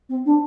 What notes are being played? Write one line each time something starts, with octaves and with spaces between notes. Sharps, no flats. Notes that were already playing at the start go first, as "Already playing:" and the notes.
C4
D4